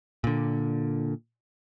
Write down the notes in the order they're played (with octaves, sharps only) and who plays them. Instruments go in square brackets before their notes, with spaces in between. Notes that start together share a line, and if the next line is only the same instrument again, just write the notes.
[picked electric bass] A#2 D3